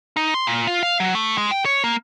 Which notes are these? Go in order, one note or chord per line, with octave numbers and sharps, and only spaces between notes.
D#4
C6
A#2
F4
F5
F#3
A3
G#3
G5
C#5
A#3